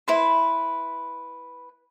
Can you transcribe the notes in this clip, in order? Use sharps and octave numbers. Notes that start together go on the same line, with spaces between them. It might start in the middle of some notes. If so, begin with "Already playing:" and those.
E4 B4 C5